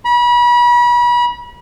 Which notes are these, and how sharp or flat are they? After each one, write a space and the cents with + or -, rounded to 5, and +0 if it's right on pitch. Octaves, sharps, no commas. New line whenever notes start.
B5 -35